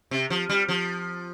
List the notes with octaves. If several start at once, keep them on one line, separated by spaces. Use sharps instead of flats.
C3
F3
G3
F3